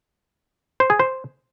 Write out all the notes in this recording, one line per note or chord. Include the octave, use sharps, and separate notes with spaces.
C5
G#4
C5